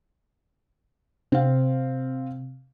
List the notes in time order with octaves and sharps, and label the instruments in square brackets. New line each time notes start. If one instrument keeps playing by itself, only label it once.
[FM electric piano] C3 [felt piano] C4 F5